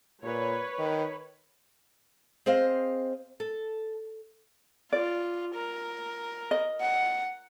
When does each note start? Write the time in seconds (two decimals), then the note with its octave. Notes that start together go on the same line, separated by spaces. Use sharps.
0.23 A#2 B4 C#5
0.79 D#3
2.46 C4 G#4 C5 D#5 F5
3.40 A4
4.92 F4 D5
5.54 A#4
6.51 D#5
6.81 F#5